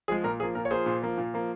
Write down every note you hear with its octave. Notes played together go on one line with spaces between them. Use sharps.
F3 G#3 G#4
A#2 A#4
F3 A#3 G#4
A#2 A#4
C#5
F3 A#3 G#4 C5
A#2
F3 A#3
A#2
F3 A#3